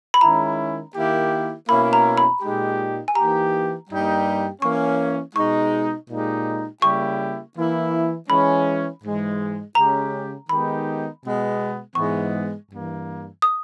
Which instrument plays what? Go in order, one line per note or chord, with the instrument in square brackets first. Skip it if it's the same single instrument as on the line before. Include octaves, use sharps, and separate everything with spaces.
[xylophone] B5
[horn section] D#3 G#3 C#4 E4 [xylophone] A#5
[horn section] D#3 A#3 E4 G4
[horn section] B2 A#3 C#4 E4 [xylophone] B5
[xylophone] A#5
B5
[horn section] A#2 G#3 D#4 G4
[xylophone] G#5
[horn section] E3 A#3 D#4 G4 [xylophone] A#5
[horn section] G2 G3 A#3 D#4 G4
[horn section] E3 A#3 C#4 [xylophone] C#6
[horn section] B2 G#3 D#4 [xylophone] C#6
[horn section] A#2 G#3 D#4 G4
[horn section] C#3 G3 A#3 E4 G4 [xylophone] C#6
[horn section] E3 A#3 E4
[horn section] E3 G#3 C#4 [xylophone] B5
[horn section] G#2 E3 G#3
[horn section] C#3 G#3 C#4 G4 [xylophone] A#5
[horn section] D#3 G#3 B3 D#4 G4 [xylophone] B5
[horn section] B2 G#3 B3
[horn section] G#2 E3 G#3 B3 [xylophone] C#6
[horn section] G2 E3 A#3
[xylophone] D#6